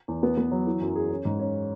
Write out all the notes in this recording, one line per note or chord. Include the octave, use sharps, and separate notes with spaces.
E2
B3
B3
F#3
E3
F#2
G#4
C#4
G#2
C#4